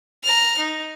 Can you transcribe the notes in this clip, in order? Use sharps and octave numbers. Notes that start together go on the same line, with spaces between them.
A#5 F6
D#4